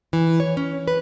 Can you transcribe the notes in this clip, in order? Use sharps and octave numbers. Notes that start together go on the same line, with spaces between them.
E3
C#5
C#4
B4